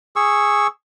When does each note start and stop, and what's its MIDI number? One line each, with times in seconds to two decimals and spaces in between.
0.16 0.67 68
0.16 0.67 85
0.16 0.67 88